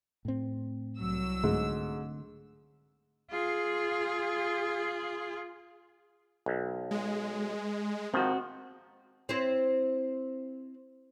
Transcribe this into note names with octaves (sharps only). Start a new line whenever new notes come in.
A2 C4
C2 F#3 E6
G#2 D3 A3 C4
F4 G#4
B1
G#3
D#3 F3 C4 F#4
C4 E4 C5